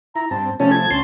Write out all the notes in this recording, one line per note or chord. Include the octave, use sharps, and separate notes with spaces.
E4 A#5
G2 C4 A5
C3 F3 A3 C#4 A5
G#6
D2 C#4 A5 C6